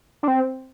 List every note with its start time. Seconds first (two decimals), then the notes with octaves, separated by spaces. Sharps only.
0.23 D4
0.28 C4